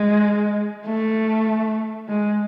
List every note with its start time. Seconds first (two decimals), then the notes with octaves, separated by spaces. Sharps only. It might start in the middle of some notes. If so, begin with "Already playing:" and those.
Already playing: G#3
0.86 A3
2.09 G#3